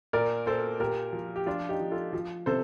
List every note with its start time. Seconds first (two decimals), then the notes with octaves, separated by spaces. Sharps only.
0.13 A#2 A#4 D5
0.46 A#2 A4 C5
0.80 A#2 G4 A#4
1.13 F3
1.36 G4
1.46 F3 D4 F4
1.69 D#4 G4
1.80 F3
1.91 F4 A4
2.13 F3
2.46 C3 A4 C5